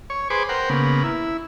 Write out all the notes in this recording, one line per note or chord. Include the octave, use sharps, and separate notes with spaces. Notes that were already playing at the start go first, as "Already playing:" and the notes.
C#5
G#4 B4 C5 D6
A#4 C5 F#5 G5
C#3 A#3 B3
E4